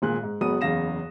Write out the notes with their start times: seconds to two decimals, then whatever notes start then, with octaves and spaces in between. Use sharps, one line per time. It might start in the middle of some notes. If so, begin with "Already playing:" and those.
0.02 G#1 A#2 G#4 F#6
0.23 G#2
0.41 F#1 G#3 B3 F#4 D#6 D#7
0.61 F#1 E2 C#3 F5 A#6 E7